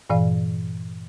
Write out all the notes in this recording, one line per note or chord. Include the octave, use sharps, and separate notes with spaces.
G2 A#2 E3 D5 F5